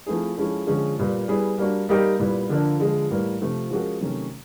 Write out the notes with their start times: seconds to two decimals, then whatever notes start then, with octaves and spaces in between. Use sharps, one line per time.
0.06 F3 A3 C4 E4 G#4
0.37 F3 G#3 C#4 E4 A4
0.67 D3 F3 G#3 C#4
0.98 A#2 G3 B3
1.28 G3 B3 E4 G#4
1.58 G3 A#3 D4 F#4
1.89 G3 A#3 D#4 G4 A#4
2.19 A#2 G3 B3 E4
2.49 D3 F3 A#3 D4
2.80 D3 F3 G#3
3.10 A2 E3 G3 A#3
3.41 C3 F3 A3 C4 F4
3.70 F3 G#3 C#4 F#4 A#4
4.01 C3 D#3 F#3 A3 C#4